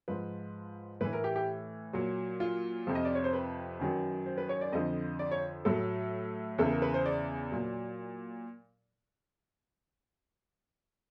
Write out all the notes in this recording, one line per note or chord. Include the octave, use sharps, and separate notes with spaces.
G#2 F3 B4
A2 E3 B4
A#4
G4
G4
A#2 F#3
F4
F2 C3 F3
D#5
D5
C#5
C5
B4
F#2 D#3 F#3
C5
B4
C#5
D5
F2 D3 F3 D#5
D5
C#5
A2 F#3 A4
E2 C#3 E3 A4
A#4
B4
C5
D5
A#2 F#3